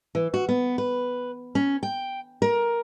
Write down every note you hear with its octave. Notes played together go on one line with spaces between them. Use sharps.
E3
F#4
B3
B4
C#4
G5
A#4